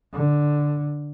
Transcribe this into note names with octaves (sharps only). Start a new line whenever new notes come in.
D3